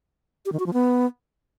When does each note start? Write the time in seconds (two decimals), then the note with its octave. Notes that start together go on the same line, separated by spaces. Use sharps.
0.46 G4
0.52 D#3
0.59 F#4
0.66 F3
0.73 B3